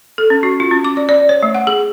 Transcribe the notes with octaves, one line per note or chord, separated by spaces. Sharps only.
A4
C#4
F#4
F4
C#4
D6
D5
D5
C#5
A3
F#5
G#4